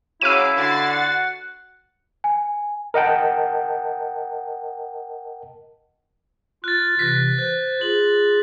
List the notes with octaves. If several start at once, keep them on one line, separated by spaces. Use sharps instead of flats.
C#3 F#3 C#4 E4 F5 D6 E6 D#7
D3 F#4 A6 C7
F#5
G#5
A#4 D#5 F#5 G5 A5
F4 F6 F#6 A6
C3 E3 F#6 A#6 B6
C5 F#6
F4 G#4 F#7